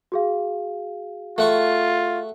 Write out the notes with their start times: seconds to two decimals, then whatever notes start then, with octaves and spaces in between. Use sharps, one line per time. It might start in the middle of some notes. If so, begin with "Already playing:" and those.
0.12 F#4 G#4 F5
1.38 A3 F4 F#5 C#6